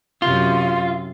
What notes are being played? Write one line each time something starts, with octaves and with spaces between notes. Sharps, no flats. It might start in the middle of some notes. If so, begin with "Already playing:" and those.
F#2 C3 F4